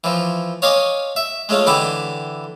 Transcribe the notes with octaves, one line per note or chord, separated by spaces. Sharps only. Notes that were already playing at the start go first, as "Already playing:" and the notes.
E3 F3
C#5 D#5 F5 G#5 C6 D6
E5
G#3 A3 C#4 F4
D3 E3 E4 G4 B5 D6